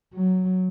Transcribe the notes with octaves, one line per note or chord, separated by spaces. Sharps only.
F#3